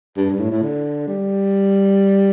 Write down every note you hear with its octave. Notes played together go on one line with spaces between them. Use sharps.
G2
G2
A2
A2
D3
G3